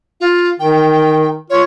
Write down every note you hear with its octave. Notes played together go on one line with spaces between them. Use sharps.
F4
D#3 G5
F4 C#5